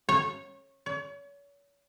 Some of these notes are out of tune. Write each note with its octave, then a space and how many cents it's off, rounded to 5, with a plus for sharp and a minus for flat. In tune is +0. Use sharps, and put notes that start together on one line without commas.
C#5 -20
C#5 +40